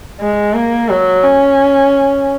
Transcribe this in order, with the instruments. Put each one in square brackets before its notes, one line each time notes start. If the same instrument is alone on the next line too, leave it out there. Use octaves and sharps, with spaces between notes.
[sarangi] G#3
A#3
F#3
C#4